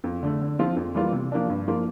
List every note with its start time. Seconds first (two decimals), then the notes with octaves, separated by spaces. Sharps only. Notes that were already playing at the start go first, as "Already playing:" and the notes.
0.04 F2
0.23 D3 A3
0.41 D3
0.59 F3 C4 F4
0.76 F2
0.95 E3 G3 A#3 F4
1.13 C3
1.32 F3 A#3 D4
1.50 G2
1.68 F3 A#3 F4